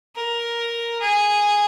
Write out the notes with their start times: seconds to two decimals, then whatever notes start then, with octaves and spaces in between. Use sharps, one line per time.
0.15 A#4
1.01 G#4